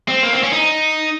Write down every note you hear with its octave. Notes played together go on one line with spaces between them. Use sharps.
C4
A#3
C4
C#4
D#4